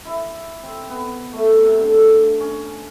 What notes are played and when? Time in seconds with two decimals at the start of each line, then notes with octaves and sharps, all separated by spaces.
0.05 E4
0.63 C4
0.89 B3
1.33 A3
1.62 C3
1.80 D3
2.40 C#4